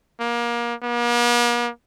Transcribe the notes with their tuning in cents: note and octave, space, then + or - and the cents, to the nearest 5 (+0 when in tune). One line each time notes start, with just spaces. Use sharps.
A#3 +30
A#3 +45